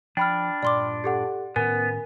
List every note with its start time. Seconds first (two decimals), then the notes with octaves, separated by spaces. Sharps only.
0.17 F3 D4 G5 B5 F6
0.63 G2 A#2 D5 C6 D6
1.04 G4 A4 F#5
1.56 A2 D#3 B3 C#4 A#4 G#5